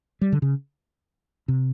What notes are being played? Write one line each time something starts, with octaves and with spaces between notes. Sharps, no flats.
G3
D3
C#3
C3